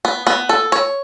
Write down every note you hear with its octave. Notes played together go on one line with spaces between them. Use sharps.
B3
B3
A4
C#5